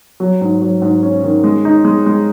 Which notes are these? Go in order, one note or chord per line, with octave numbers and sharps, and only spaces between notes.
F#3
G#2
F#3
G#2
C#4
D#3
G#3
D#4
G#3
G#3